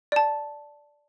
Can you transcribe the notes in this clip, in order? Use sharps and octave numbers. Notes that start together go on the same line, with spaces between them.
D5 A5